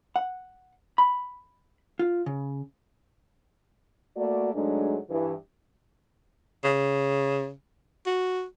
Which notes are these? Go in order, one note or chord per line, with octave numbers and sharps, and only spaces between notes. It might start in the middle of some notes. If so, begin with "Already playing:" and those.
F#5
B5
F4
C#3
A3 A#3 F#4 D5
G#2 F#3 G#3 A3 D4
G2 E3
C#3
F#4